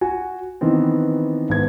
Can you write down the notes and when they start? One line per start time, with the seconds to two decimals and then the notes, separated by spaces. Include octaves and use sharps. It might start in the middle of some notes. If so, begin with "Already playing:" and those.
0.01 F#4 G#5
0.61 D#3 E3 B3 C4
1.49 G#1 B3 G#6